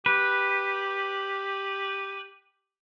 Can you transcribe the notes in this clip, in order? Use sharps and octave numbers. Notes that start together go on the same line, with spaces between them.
G4 B4